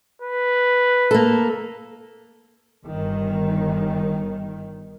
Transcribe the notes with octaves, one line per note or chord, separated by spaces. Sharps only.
B4
A#3 A4
G1 D#3